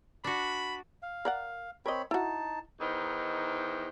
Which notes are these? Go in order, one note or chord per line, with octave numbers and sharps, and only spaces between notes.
D4 F#4 B5
F5
A#4 D5 F#5
C4 A#4 C#5 D#5 B5
D#4 E4 F#4 A5
E2 D#3 E3 D#4 C5